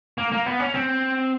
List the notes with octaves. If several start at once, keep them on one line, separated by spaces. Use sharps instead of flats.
A#3
A#3
B3
C#4
C4